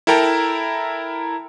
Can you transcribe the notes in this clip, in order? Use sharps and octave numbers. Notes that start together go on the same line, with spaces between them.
E4 A4 A#4 G5 A5 A#5